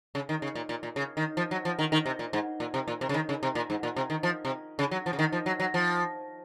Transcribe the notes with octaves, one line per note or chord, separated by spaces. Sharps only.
C#3
D#3
C#3
A#2
A#2
A#2
C#3
D#3
F3
F#3
F3
D#3
D#3
C3
A#2
G#2
A#2
C3
A#2
C3
C#3
D#3
C#3
C3
A#2
G#2
A#2
C3
D#3
F3
C3
C#3
F#3
F3
C#3
D#3
F3
F#3
F#3
F3